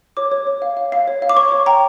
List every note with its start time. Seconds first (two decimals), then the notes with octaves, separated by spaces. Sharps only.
0.17 C#5 D6
0.32 C#5
0.47 C#5
0.62 F5
0.77 F5
0.92 F5
1.08 C#5
1.22 F5
1.29 D6
1.37 C#5 C#6
1.52 C#5
1.66 G5 A#5